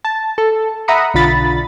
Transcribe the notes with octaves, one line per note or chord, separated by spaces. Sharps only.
A5
A4
E5 F#5 A#5 B5 D#6 C#7
B1 D3 F4 B5 A6